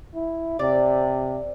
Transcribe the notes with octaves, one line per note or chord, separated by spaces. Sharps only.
E4
C3 D5